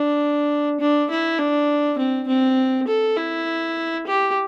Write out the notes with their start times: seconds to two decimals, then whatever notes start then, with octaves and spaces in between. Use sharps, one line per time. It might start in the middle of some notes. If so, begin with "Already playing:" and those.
Already playing: D4
0.80 D4
1.11 E4
1.39 D4
1.99 C4
2.28 C4
2.88 A4
3.17 E4
4.07 G4